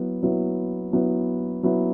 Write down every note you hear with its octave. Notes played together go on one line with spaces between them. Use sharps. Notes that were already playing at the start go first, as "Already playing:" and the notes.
Already playing: F#3 B3 E4
F#3 B3 E4
F#3 B3 E4
F#3 B3 E4